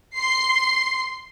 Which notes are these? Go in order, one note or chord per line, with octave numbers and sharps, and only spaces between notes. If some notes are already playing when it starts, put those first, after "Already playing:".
C6 C7